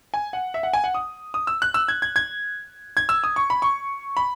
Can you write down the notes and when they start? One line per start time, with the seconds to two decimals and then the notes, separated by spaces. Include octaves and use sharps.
0.14 G#5
0.33 F#5
0.54 E5
0.63 F#5
0.73 G#5
0.84 F#5
0.95 D#6
1.34 D#6
1.47 E6
1.62 F#6
1.74 E6
1.88 G#6
2.02 G#6
2.16 G#6
2.97 G#6
3.09 E6
3.24 D#6
3.36 C#6
3.50 B5
3.62 C#6
4.17 B5